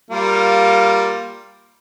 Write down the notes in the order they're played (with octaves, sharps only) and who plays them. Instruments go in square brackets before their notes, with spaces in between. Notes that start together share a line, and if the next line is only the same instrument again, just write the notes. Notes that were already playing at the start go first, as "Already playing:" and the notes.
[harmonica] G3 A#3 F4